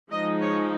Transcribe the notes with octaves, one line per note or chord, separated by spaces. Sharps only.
F3 G#3 D#4 D#5
C#5